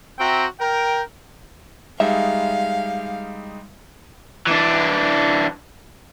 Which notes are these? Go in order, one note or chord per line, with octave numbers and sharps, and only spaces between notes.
C4 F#4 E5 G5 A#5
A#4 G5
G3 G#3 D#4 E5 F5
E3 D4